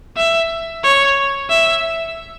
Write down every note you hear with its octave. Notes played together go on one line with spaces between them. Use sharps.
E5
C#5
E5